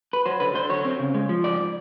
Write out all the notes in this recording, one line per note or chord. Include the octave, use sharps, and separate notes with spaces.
B4
F#3 C5
D3 B4
D3 C5
F#3 C#5
C4
C#3
G#3
F3
G#2 D5